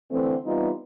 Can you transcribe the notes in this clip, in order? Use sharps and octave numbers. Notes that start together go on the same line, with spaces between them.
D3 E3 A3 C4
E3 G3 B3 C4 D#4 F4